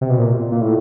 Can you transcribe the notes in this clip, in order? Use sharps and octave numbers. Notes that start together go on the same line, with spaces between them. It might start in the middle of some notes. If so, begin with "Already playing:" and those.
C3
B2
A#2
A#2
A2